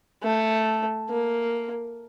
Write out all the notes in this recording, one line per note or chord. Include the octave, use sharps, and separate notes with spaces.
A3
A#3